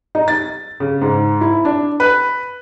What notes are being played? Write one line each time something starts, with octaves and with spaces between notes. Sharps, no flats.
D#4
A6
C#3
G#2
E4
D4
B4